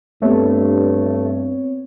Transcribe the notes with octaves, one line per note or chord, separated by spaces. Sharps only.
G2 A3 B3 C4 C#5